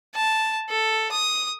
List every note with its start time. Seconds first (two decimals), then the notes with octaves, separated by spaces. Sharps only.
0.15 A5
0.70 A4
1.11 D#6